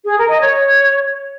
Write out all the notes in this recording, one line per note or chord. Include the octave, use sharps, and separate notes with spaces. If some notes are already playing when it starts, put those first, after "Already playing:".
G#4
A#4
D#5
C#5